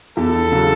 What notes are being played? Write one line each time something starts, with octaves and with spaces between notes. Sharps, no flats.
E2 A4
C#3 F#3